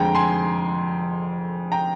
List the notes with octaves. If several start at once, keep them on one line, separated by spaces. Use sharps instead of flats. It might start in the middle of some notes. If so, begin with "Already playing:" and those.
Already playing: F1 F2 D3 G#3 G5 A#5
G#5 C6
G5 A#5